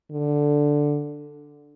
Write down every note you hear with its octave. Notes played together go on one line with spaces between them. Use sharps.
D3